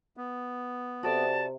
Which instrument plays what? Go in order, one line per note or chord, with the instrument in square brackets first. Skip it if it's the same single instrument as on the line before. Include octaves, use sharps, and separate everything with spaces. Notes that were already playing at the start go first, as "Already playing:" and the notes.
[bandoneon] B3
[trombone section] C3 [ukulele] F#4 A4 D5 [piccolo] A5